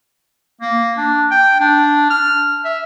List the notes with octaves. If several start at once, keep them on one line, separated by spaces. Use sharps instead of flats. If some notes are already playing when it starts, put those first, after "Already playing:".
A#3
D4
G5
D4
F6
E5